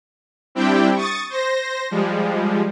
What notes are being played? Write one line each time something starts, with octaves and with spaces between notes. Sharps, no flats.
G3 C4 D4 E4 G4 G5
C#6 D#6 A6
C5 A#6
F3 G3 G#3